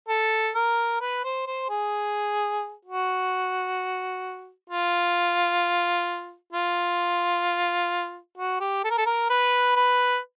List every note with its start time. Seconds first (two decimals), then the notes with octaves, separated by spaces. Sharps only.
0.08 A4
0.55 A#4
1.01 B4
1.24 C5
1.47 C5
1.69 G#4
2.85 F#4
4.70 F4
6.53 F4
8.38 F#4
8.60 G4
8.84 A4
8.90 A#4
8.98 A4
9.06 A#4
9.30 B4
9.76 B4